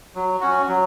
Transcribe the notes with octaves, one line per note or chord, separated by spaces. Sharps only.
F#3
C#4 F#4
F#3